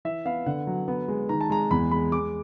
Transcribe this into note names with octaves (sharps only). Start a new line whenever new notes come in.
E3 E5
B3 F5
D3 F#5
F#3
B3
G#3
D#3 A#5
A5
G#3 A#5
E2 B5
G#3 B5
G#3 D6